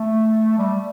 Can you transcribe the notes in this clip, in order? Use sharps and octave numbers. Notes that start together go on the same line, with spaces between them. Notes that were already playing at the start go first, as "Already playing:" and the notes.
Already playing: A3
G3